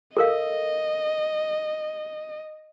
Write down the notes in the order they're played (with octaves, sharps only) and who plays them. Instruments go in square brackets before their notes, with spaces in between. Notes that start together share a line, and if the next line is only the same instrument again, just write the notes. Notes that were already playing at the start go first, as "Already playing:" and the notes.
[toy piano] A4 A#4 F5 [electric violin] D#5